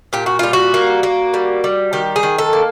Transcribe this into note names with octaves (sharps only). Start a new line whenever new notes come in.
A#2 G4
F#4
G3 F4
F#4
A#3
A#3
G3
G3
D#3 G4
G#4
D#3
A4
A#3